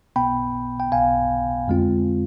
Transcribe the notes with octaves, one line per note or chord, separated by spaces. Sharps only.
B1 B2 B3 G5 B5
G5
B1 B2 B3 F5 G#5
F2 D3 G#3 C4 F4